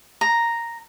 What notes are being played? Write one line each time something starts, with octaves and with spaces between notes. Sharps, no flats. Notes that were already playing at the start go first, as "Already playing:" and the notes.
A#5